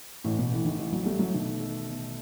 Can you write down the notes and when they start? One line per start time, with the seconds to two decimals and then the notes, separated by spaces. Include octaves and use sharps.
0.24 A1 A2
0.39 B2
0.52 A2 E3
0.65 D#3
0.79 A1 E3
0.92 F#3
1.05 G3 A3
1.19 F#3
1.33 B2 D#3
1.60 A4
1.88 B2